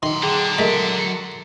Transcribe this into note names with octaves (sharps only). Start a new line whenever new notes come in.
D#3 F#3 C6
D3 G#4 G5
G#3 A3 A#4 B6